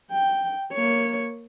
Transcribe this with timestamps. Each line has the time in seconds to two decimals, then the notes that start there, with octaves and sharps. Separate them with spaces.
0.12 G5
0.73 A#3 C#5